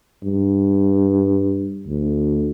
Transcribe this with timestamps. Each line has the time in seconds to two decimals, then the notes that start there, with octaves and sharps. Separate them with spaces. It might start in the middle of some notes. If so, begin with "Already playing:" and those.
0.23 G2
1.87 D2